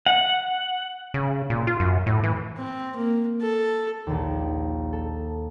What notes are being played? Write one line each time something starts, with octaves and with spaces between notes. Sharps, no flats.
F#5
C#3
A#2
F4
F#2
A2
E3
C4
A#3
A4
A#1 D#2
A4